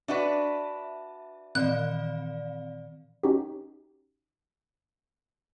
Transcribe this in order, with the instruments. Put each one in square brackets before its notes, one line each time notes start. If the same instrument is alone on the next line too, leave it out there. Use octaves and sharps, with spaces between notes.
[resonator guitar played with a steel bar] D4 F#4 B4 [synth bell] E5
[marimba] A#2 D#3 E3 [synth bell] C4 D5 F5 [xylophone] F#6
[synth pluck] C#4 D#4 F#4 G4